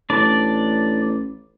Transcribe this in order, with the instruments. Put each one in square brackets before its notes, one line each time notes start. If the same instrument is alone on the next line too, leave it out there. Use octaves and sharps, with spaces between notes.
[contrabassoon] A1 [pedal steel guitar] D4 D5